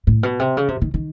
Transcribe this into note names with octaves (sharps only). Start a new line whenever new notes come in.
A2
B2
C3
C#3
C3
D#3
D#3